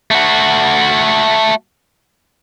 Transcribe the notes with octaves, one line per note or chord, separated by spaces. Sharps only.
A3 F#4